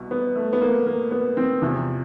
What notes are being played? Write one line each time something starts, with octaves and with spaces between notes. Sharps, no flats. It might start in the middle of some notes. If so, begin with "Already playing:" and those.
Already playing: C2 B2
B3
A3
B3
A#3
A#3
B3
C4
E2 C3 F3